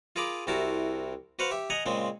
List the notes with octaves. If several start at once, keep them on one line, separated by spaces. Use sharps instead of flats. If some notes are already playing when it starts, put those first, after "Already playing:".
F4 G#4 A#4 B5 D6
C2 C3 E4 F#4 A#4 A5
F#4 B4 C5 F5 F#5
G4 E5
D#5 F#5 G#5 A#5
A#2 C#3 G#3 C4